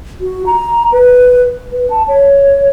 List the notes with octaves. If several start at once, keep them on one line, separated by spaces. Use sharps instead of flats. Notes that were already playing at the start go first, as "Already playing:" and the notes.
F#4
A#5
B4
B4
A5
C#5